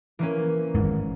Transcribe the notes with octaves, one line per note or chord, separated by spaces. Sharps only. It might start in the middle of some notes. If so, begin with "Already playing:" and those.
E3 A#3 C#4
G#1 G#2